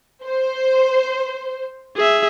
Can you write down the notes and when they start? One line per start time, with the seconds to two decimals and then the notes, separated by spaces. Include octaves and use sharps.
0.24 C5
1.96 G#4 E5